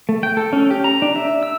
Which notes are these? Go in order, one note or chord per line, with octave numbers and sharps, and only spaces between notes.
A3
G5
A4
C#4
G4
A#5
D4
E5
E6